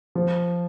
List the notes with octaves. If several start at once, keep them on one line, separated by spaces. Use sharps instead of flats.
F3